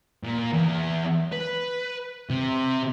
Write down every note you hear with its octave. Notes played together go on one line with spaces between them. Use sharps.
A#2
E2
B4
C3